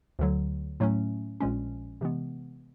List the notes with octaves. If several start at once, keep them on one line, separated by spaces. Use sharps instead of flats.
D2 D3 F#3
A2 F#3 A3 C#4
A#1 A#2 F3 G#3 C#4
C3 E3 G#3 B3